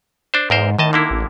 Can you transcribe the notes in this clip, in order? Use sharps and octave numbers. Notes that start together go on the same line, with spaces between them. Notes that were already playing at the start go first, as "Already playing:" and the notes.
D4 C5
E2 G#2 A#4 C5
A2 D#3 D#5 A5
D3 A#3 E4
A1